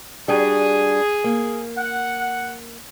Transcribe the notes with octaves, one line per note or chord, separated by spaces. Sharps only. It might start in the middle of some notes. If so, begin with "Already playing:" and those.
G3 D4 F#4 G#4
A#3
F#5